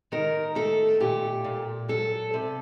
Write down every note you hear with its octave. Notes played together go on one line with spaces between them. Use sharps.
D#3 A#4
A3 A4
A#2 G4
A#2
F#3 A4
C3